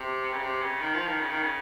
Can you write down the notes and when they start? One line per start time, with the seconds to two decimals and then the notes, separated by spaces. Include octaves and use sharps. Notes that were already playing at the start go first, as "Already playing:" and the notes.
Already playing: C3
0.33 C#3
0.42 C3
0.61 C#3
0.81 D#3
0.94 F3
1.07 D#3
1.20 C#3
1.31 D#3
1.43 C#3